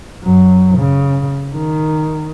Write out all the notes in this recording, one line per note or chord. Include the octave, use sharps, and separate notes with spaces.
F#2 F#3
C#3
D#3